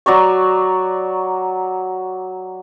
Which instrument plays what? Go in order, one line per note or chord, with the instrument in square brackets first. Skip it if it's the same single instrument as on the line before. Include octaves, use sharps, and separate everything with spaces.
[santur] F#3 D5 A#5 C#6